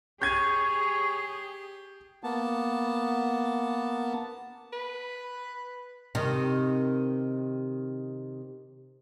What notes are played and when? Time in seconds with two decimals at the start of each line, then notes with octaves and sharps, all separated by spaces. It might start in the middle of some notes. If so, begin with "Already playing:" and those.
0.22 G4 G#4 C#5 G6 G#6 D#7
2.23 A#3 B3 A5
4.73 B4
6.15 C3 D#3